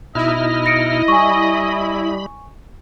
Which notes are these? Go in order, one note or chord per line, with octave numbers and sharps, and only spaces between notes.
B2 D#4 E4 D#5 F6
A#6 C#7 D7
G3 G#5 B5 C#6